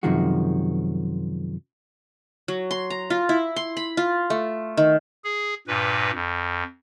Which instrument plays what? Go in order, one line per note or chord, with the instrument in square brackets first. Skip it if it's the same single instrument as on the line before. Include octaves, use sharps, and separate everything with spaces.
[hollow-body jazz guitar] F#2 C3 D#3 F3 G#3 F#4
[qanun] F#3
C6
A#5
F4
E4
C6
B5
F4
A3
D#3
[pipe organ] G#4
G2 A#2 B4
F2